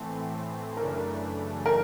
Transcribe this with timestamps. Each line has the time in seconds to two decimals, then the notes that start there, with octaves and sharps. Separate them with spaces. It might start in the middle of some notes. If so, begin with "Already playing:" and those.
Already playing: A2 E3 A3 C4
0.77 F#2 C#3 E3 A3 D4 A#4
1.66 A#4